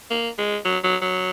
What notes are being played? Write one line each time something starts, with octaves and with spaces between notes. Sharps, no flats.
A#3
G#3
F#3
F#3
F#3